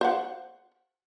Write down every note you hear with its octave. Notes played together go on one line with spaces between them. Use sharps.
C5 F5 F#5